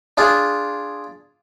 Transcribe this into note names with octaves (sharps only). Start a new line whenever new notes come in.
D4 F4 G#4